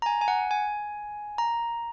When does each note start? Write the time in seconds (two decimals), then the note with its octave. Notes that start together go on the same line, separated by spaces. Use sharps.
0.02 A#5
0.06 G#5
0.21 G#5
0.28 F#5
0.51 G#5
1.38 A#5